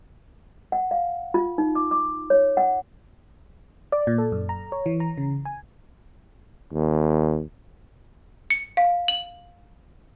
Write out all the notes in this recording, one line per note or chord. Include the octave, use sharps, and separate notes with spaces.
F#5
F5
F4
D#4
D6
D6
C#5
F#5
D5
A#2
A4
F#2
A#5
C#5
E3
A#5
C#3
G#5
D#2
C#7
F5
F#7